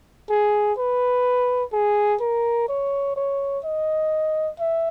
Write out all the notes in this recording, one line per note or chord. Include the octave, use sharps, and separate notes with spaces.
G#4
B4
G#4
A#4
C#5
C#5
D#5
E5